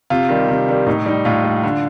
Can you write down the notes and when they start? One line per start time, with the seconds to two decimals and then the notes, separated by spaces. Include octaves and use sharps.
0.10 C3 F4
0.29 D#3 G3
0.48 C3
0.68 D#3 G3
0.86 A2 D#4
1.06 G3 D#4
1.25 A2 F4
1.44 G3
1.63 D3